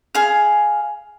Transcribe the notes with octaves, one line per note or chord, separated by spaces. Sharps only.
G#4 F5